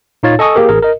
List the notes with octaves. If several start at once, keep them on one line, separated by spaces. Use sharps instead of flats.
A#2 D#4 F4 C#5 F5 A6
A4 D#5 G#5 C#6 D#6 E6
A#3 G4 G#4 A#4
A1 G#4 A#4
A#4 D#5